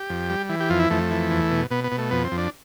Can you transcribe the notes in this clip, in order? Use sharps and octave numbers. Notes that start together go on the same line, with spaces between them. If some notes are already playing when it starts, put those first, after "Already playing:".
Already playing: G4
F2
G3
E3
G4
F2 F4
E4
F2 A3
E3
E2
B2
B2 B3
B3
B2
A3
F2 B3
C4
F2
D4